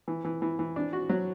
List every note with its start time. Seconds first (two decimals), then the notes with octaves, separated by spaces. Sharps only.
0.08 E3
0.25 E3
0.42 E3
0.59 E3
0.76 D4
0.93 F#4
1.10 F#3